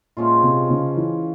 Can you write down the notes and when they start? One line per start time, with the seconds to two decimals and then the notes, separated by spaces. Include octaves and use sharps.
0.17 A#2 F3 G#3 C#4 F4
0.43 C3
0.70 C#3
0.97 E3